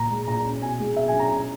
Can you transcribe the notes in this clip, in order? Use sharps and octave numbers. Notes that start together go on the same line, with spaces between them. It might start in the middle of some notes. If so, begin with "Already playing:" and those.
Already playing: A#2 A#5
G#3
A#2 A#5
C#4
B2 G#5
G#3
B2 E5
G#5
C#4
A#5
B2